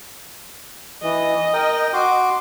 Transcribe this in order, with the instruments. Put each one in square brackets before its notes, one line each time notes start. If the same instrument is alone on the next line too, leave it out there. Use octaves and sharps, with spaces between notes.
[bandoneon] E3 [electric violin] D#5
[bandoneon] A#4 G5
F#4 C6 D6